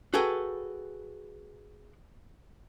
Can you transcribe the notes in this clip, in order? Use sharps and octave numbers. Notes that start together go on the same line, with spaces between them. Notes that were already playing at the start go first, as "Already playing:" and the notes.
F#4 G#4 A4 B4 G5